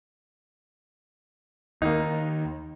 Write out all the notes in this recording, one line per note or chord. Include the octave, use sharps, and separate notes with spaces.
D#2 D#3 A#3 D#4